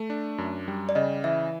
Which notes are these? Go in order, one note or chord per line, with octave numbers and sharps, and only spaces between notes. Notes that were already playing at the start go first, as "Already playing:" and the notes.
Already playing: A3
D4
F#2
G3
D5
C#3 D#5
E3 E5